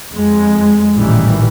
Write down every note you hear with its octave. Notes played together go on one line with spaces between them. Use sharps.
F2 G#3
A1 A#2 D#3 E3 G3